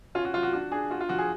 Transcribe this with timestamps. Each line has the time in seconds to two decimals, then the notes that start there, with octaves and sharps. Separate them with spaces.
0.15 C#4 F4
0.25 F#4
0.34 F#3 F4
0.43 F#4
0.53 D4 F#4
0.71 D4 G#4
0.90 F4 F#4
1.01 F4
1.09 F3 F#4
1.19 G#4